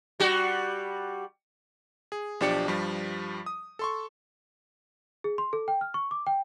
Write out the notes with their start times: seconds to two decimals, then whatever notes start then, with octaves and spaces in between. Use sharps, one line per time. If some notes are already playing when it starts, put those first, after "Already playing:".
0.20 G3 F#4
2.12 G#4
2.40 B1 F3 D4 G4 D5 C#7
2.68 G2 F3 G3
3.46 D#6
3.79 A4 C6 C#6
5.24 G#4
5.38 C6
5.53 A4
5.68 G5
5.81 F6
5.94 C#6
6.11 D6
6.27 G5